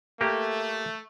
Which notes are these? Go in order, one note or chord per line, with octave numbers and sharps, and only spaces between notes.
A3 A#3 G4